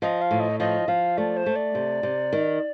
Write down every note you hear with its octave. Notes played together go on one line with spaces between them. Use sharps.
F3 D#5
F5
A2
D#5
F3 D#5
F3 F5
A3 D5
C5
A3
D5
C3
C3
D#3